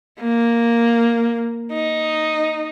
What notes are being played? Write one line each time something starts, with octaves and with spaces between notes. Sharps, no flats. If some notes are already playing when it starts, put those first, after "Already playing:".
A#3
D#4